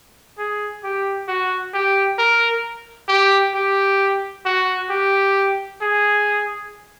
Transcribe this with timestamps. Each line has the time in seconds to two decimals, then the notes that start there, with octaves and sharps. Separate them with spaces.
0.38 G#4
0.83 G4
1.28 F#4
1.74 G4
2.18 A#4
3.09 G4
3.55 G4
4.45 F#4
4.90 G4
5.81 G#4